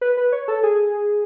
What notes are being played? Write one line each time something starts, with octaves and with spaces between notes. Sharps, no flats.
B4
B4
C#5
A4
G#4